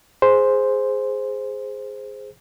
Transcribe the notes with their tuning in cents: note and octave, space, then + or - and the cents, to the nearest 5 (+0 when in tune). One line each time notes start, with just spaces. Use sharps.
G#4 +0 C5 +0